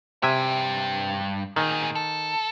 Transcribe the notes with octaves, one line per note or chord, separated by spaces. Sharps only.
G2 C3 E5 G5 G#5
A#2 D#3 G#4
A4